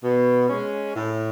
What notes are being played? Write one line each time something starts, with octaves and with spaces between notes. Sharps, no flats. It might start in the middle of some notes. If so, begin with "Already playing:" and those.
B2
G#3 C#4
A2